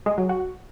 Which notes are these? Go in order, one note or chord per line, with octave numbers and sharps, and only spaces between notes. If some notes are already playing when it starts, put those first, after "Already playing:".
G#3
F#3
F#4